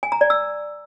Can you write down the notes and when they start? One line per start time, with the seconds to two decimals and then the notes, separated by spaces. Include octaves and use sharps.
0.03 G#5
0.12 A#5
0.21 D5
0.30 E6